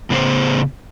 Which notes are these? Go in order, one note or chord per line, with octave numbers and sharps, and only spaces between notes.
A2 C#3 B3 G#4 C5